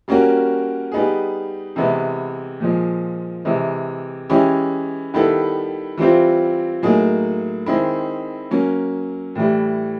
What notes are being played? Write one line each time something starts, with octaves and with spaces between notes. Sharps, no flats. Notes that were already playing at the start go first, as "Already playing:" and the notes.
G3 A#3 C#4 F#4 A#4
G3 B3 D#4 G#4
C3 E3 G#3 B3
A#2 F3 G#3
C3 E3 G#3
E3 G#3 C#4 E4 G4
D#3 G3 B3 E4 A4
E3 G3 C4 F4
A2 F#3 A#3 D#4 G#4
D#3 G#3 C4 E4
F#3 A#3 C#4
A2 E3 G3